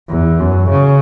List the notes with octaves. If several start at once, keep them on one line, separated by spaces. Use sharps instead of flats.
E2
F#2
C#3